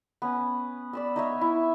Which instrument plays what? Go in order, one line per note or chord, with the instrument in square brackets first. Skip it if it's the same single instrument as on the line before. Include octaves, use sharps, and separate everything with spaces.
[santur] B3 C#4
D5 B5 E6
D#4 C#5 E5
E4